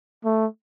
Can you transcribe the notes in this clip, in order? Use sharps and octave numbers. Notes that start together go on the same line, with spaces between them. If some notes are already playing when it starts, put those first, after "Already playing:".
A3